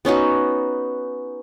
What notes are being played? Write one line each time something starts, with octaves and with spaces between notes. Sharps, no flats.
B3 C#4 D#4 F#4